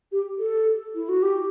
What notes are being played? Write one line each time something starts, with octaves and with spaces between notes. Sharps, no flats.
G4
A4
E4
F#4
G4